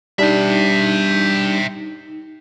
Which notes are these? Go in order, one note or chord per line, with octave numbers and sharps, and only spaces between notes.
G3 D4 D#4 E5 G5